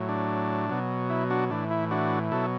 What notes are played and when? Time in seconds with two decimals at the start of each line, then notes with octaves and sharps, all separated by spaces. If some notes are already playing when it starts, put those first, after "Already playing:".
Already playing: A2 F#3
0.09 D4
0.70 B2 F#3
1.10 E4
1.30 D4 F#4
1.51 A2 E3 D4
1.70 E4
1.91 D4 F#4
2.32 B2 F#3 E4 A4